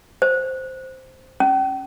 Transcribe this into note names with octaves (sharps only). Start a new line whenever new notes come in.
C5
C#4